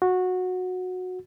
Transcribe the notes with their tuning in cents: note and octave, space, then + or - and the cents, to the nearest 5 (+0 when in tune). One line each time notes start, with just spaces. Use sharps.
F#4 -15